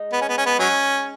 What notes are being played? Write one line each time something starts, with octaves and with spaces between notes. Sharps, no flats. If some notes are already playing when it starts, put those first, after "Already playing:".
Already playing: G#3 D#4
B3
C#4
B3
C#4
B3
F#3 C#4